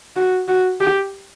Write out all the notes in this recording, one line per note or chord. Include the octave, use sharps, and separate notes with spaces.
F#4
F#4
G4